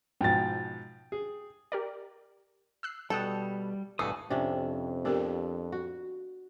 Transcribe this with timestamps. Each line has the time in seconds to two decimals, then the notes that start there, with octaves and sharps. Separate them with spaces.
0.21 G#2 B2 F3 G5 A6
1.12 G#4
1.72 G4 A#4 D5
2.83 E6 F#6 C7
3.10 B2 G3 A4 G5 A5 D#6 F#6 C#7
3.99 G2 B2 E3 A3 F#4 G#5 D#6 C7
4.30 F2 C3 C#4 D4
5.05 B3 D4 G4 A#4
5.72 F#4